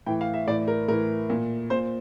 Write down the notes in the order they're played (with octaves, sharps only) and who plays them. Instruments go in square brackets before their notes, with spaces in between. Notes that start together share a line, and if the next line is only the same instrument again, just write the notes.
[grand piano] A2 E3 G5
F5
E5
A2 E3 D5
A#4
A2 E3 A#4
A#2
A#2 C5